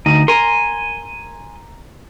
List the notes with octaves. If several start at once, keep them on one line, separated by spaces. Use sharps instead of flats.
D2 D#4
A#4 G#5 C6